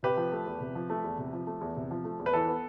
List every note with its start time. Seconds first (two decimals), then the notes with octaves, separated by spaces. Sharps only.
0.03 C3 G4 B4
0.17 F3
0.32 A3
0.46 E2
0.60 C3
0.75 F3
0.90 A3
1.04 E2
1.18 C3
1.33 F3
1.47 A3
1.61 E2
1.76 C3
1.91 F3
2.04 A3
2.19 E2
2.26 B4
2.33 E3 A4
2.48 B3